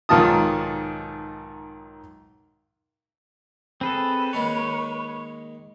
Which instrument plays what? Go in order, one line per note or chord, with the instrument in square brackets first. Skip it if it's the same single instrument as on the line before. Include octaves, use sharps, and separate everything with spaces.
[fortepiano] B1 G#2 D#3 F4 A5 D#6
[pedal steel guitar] C4 G#4 A4 [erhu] B4
[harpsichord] D#3 G#3 A#3 [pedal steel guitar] C#5